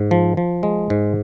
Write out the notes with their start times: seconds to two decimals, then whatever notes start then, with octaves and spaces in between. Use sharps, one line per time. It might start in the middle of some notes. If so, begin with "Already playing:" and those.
Already playing: G#2
0.11 F3
0.37 F3
0.63 G#3
0.90 G#2